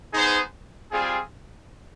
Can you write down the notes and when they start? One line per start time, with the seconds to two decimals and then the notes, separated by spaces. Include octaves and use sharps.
0.12 B3 D#4 G#4 C5
0.90 G3 C4 F4 G#4